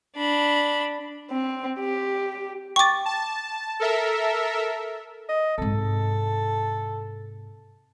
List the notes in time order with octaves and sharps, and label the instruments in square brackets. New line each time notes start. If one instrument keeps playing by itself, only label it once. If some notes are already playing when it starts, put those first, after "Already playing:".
[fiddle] D4 B5
[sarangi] C4
G4
[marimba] G5 A6 [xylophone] C#6 D6
[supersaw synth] A5
A4 A#4 E5
[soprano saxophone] D#5
[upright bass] G#2 C3 [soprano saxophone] A4